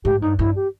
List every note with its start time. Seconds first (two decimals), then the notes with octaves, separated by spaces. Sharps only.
0.05 G#2 G4
0.21 G2 D#4
0.38 G2 E4
0.56 G4